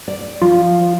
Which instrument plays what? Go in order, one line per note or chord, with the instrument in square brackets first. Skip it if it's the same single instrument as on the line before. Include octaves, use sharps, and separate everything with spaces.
[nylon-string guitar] D5
[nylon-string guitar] F3 [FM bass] F4